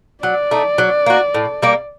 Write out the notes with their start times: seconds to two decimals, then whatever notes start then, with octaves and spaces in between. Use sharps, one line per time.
0.23 F#3 D5
0.51 A3 D#4
0.78 F#3
1.06 A#3 F#4
1.34 A2
1.62 G3 A#3